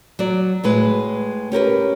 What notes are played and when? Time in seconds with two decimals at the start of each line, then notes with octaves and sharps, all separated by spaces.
0.19 F#3 D5
0.64 A2 G#3 B4
1.52 C#4 G4 A#4 B4